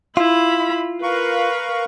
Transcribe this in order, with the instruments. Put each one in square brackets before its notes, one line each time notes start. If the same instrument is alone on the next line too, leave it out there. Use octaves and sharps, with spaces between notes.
[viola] E4 B5 [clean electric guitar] F4
[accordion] A#4 F5 C#6 [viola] B4